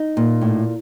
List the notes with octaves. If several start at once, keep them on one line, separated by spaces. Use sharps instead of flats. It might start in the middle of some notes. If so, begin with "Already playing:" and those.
Already playing: D#4
A#2
A2